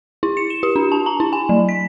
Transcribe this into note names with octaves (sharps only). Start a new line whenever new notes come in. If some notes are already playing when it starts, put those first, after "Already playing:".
E4
C#7
E7
G4
D4
A5
A#5
E4
G#5
F#3
B6